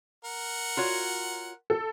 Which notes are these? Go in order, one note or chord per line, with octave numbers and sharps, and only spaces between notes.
A#4 F#5
F4 F#4 C#5
A4